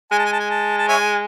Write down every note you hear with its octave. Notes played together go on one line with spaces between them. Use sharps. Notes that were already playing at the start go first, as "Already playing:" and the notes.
G#3 G#5
A5
G#5
A5
G#5
A5
A5
C#5 E5 G#5